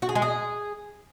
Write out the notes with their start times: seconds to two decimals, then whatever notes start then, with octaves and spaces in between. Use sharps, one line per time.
0.02 F#4
0.09 G#4
0.15 G#3
0.22 G#4